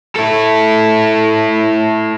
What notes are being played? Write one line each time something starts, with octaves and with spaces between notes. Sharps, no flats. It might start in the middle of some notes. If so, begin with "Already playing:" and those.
E4 A4